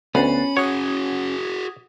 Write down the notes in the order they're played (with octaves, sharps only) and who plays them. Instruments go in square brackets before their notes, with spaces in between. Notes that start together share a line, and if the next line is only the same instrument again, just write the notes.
[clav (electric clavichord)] D2 [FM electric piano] B3 A6 C7 [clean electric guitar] C#4 [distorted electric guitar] B5
[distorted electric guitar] F#4 G#4 [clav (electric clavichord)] C#5 [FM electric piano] F#5 D#6 G#6